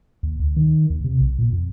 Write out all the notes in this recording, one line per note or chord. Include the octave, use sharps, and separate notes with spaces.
D#2
D2
D#3
D#2
C3
B1
A#2
F2